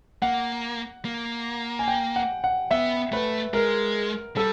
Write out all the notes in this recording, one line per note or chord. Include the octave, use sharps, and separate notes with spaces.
A#3 F#5
A#3
G#5
G5
F#5
F#5
B3 E5
A3 B4
G#3 A#4
G3 A4